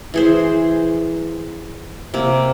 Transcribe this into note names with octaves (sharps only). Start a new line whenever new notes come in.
E3 G#4 C5
C3 A#3